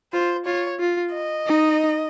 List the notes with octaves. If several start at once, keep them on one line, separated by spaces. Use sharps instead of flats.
F4 C5
F4 C#5
F4
D#5
D#4